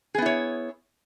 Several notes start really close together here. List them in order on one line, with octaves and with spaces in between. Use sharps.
G#4 B3 E4 C#5